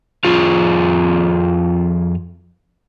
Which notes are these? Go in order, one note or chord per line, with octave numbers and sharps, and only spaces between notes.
F2 F4 G#4